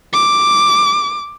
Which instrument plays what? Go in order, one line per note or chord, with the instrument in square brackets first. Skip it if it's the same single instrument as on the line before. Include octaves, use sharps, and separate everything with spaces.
[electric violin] D6